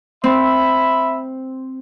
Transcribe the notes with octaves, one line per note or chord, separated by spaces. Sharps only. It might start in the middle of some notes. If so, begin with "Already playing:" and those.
C4 E5 B5